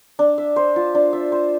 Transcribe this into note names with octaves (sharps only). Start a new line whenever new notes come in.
D4
E5
C5
F4
D4
E5
C5